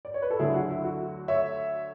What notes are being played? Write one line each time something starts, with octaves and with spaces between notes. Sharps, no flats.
D5
C#5
B4
A4
D2 D3 F#3 E4 G#4
F#4
E4
F#4
C#5 E5